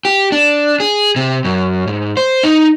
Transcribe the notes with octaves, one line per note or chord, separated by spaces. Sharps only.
G4
D4
G#4
C3
F#2
G#2
C5
D#4